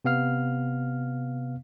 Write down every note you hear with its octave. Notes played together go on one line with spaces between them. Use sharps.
C3 B3 F5 F6